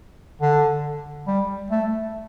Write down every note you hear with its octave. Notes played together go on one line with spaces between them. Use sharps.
D3
G3
A3